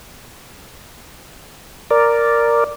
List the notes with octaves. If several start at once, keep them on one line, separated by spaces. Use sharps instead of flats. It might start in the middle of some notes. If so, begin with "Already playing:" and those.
A#4 D5